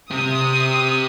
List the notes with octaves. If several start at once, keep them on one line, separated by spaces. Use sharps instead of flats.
C3 D#6